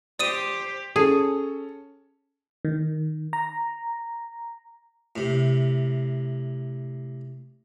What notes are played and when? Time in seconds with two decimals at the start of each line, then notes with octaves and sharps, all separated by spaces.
0.19 G4 C5 D5 D#6 D#7
0.96 C#4 G#4 A4
2.65 D#3
3.33 A#5
5.16 A2 C3